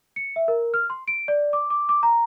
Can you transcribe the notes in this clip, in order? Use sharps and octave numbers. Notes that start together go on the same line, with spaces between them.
C#7
E5
A#4
F6
C6
D7
D5
D6
D6
D6
A#5